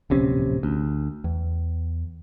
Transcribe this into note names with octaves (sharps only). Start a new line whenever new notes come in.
D1 A#1 C3 C#4
D2
E2